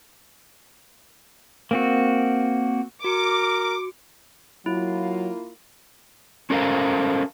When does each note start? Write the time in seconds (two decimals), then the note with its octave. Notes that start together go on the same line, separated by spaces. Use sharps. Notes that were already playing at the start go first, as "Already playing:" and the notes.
1.71 A#3 C4 F#4
3.04 F#4 A#4 D6 C#7
4.66 F#3 A#3 E4 F4
6.50 C#4 F#4 A4 A#4 C5 F5